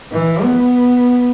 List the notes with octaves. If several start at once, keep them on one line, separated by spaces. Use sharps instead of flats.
E3
B3